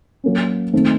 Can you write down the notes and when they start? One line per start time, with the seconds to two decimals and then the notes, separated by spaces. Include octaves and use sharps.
0.24 F#3 A#3 C#4
0.73 D#3 A3 C4